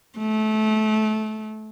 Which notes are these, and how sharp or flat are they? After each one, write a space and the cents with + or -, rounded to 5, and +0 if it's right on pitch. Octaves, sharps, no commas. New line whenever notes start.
A3 -25